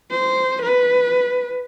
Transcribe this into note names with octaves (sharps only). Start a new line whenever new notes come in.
C5
B4